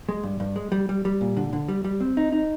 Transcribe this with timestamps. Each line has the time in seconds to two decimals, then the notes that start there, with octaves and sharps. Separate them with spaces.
0.09 G#3
0.23 G2
0.40 G2
0.56 G#3
0.72 G3
0.89 G3
1.05 G3
1.21 A#2
1.37 D3
1.53 D3
1.68 G3
1.84 G3
2.01 C4
2.17 D#4
2.32 D#4